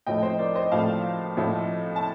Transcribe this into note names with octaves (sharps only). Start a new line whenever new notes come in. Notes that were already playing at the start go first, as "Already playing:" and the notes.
A2 F3 A3 D#5 G5
C5 D#5
A#4 D5
C5 D#5
A2 F3 A3 F5 A5
A2 F3 A3
A5